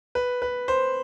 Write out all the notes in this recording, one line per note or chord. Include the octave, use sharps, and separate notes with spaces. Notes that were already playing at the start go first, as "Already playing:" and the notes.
B4
B4
C5